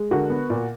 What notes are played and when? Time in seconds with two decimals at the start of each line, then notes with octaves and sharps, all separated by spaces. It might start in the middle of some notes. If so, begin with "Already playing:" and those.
Already playing: G#3
0.11 D3 F#4 A#4
0.30 B3
0.50 A#2